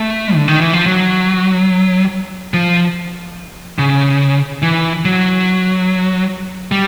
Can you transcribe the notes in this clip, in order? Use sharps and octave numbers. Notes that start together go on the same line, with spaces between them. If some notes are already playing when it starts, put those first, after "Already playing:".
Already playing: A3
D3
D#3
E3
F3
F#3
F3
C#3
E3
F#3
G3